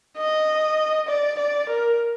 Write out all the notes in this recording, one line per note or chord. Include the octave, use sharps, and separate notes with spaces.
D#5
D5
D5
A#4